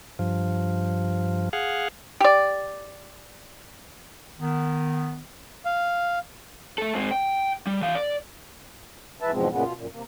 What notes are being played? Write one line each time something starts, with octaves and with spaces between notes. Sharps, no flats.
G2 F3
G#4 F5 F#5
G4 D5
D#3 B3
F5
A3 A4
G#2 C4
G5
G3
E3 F5
D5
G#2 E3 B4 E5 A5
E2 G#2 B2 F3 G#3 C4
F#2 A#2 C#3 G#3 B3
B2 F4
F#2 A#2
C3 A#3